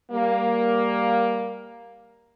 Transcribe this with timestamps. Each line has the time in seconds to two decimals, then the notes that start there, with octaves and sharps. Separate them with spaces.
0.11 G3 A#3